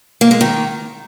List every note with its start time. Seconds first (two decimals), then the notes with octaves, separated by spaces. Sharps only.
0.21 A#3
0.31 G#3
0.41 D#3